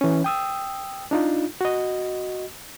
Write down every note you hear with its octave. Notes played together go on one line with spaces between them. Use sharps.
E3 C#4
G5 D#6 E6
D4 D#4 F4
F#4 D#5